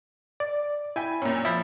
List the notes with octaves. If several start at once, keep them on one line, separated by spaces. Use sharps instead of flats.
D5
E4 G5 G#5 B5
F#2 A#2 C#5
F3 E5 F5 B5